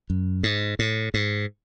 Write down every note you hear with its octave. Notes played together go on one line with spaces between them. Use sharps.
F#2
G#2
A2
G#2